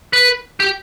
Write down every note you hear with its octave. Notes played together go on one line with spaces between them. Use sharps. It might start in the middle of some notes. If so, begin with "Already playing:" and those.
B4
G4